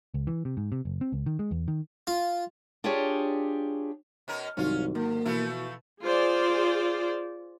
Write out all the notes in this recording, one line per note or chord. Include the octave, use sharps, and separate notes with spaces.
C#2
E3
C3
G#2
C3
F#1
C4
C#2
D#3
G#3
E2
D#3
F4
D4 F4 G4 G#4 C#5 D5
B2 C#4 A#4
C2 G#2 D#3 F#3 C#4 F4
D3 A#3
B2 E3 F3 A3 E4
F4 G#4 C5 D5